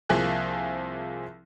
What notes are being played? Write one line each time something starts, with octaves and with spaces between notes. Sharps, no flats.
C2 F3 A#3 G#4 F#6